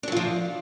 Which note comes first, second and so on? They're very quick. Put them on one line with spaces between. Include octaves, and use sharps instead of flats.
D4 F#3 F4 F3